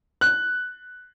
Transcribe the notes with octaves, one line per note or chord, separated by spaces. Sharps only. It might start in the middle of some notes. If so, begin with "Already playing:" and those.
F#6